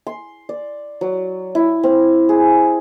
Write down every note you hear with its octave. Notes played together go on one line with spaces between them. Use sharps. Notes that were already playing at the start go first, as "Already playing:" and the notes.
C6
D5
F#3
E4
C4
G#4